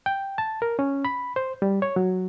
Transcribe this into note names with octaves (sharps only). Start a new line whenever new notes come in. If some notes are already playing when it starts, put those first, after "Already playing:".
G5
A5
A#4
C#4
B5
C5
G3
C#5
F#3